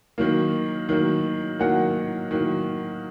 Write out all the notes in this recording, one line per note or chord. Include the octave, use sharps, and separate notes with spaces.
D#3 F#3 A#3
D#3 F#3 A#3
D#3 F#3 A#3 F#5
D#3 F#3 A#3